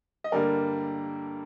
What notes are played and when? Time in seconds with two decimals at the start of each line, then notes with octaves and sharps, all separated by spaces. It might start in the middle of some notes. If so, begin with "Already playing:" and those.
0.24 D#5
0.32 G2 D3 G3 A#3 A#4 D5